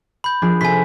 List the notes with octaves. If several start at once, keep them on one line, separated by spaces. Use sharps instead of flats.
B5 G6
F3 D4 G#4
C3 A4 G#5 C6 B6